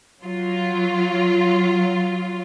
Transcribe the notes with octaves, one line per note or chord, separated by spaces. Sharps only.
F#3 F4